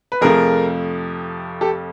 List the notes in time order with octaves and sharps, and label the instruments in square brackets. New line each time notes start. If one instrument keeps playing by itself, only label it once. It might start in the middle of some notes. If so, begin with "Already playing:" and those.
[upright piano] B4
F2 C3 F3 A3 G#4 A#4
G4 A4